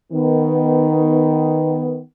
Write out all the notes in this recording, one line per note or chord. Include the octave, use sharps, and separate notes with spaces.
D#3 B3